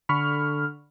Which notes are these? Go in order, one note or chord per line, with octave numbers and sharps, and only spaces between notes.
D3 B5 C#6 F6